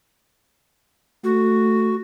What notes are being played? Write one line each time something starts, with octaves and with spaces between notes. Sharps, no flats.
A3 F#4